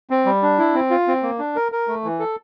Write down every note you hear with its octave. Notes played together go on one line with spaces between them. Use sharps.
C4
G3
D4
E4
C4
F4
C4
A#3
D4
A#4
A#4
A3
E3
A4